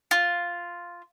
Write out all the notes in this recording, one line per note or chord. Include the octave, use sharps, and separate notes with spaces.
F4